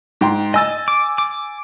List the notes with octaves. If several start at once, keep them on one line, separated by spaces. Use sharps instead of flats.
G#2 G5 C6
D#5 G#5 E6 A6
D6
D6